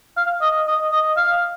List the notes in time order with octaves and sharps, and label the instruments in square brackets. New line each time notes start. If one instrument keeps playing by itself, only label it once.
[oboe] F5
D#5
D#5
D#5
F5